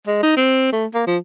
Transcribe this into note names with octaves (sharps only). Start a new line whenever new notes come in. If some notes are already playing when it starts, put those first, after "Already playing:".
G#3
D#4
C4
A3
A#3
F3